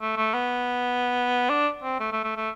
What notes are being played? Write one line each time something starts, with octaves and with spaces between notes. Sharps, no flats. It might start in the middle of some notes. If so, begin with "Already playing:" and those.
A3
A3
B3
D4
C4
A3
A3
A3
A3